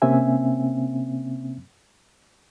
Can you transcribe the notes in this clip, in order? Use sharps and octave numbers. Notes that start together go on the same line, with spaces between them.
C3 A#3 C4 C#4 E5 G#5